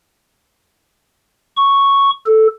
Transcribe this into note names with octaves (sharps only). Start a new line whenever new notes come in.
C#6
A4